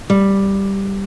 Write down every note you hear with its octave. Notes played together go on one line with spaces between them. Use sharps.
G3